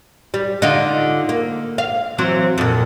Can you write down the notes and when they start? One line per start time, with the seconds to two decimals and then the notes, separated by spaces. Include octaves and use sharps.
0.34 G3
0.62 D3 D#4 F4
1.29 A#3
1.78 F5
2.18 E3 F#3 C4
2.58 F2 A#2